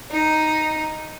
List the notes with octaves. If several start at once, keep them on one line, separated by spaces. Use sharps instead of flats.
D#4